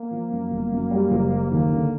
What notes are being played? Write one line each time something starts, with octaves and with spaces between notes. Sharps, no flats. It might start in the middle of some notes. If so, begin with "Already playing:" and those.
Already playing: A#3
F3
F#2
G1
F#2
G3
F#1
G3
D#2 A#3
D3